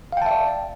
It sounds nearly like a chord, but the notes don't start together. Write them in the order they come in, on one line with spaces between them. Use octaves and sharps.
F5 G5 A5 E5 D5